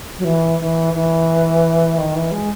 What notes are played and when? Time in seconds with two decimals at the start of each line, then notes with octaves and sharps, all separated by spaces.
0.18 F#3
0.24 E3
0.60 E3
0.93 E3
1.97 D#3
2.15 E3
2.31 G#3